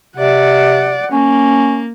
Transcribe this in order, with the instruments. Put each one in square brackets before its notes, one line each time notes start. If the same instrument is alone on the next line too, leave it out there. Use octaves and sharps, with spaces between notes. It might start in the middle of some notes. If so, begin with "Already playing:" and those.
[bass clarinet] C3 [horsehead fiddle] D5 F#5
[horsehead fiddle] A#3 [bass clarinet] C#4